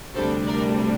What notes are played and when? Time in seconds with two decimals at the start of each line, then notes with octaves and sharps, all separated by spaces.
0.14 D2 C3 G3 D4 A4 C5
0.47 A#4 D5